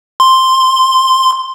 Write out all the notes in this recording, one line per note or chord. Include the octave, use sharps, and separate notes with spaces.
C6